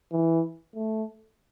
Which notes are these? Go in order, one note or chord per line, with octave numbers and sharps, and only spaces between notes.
E3
A3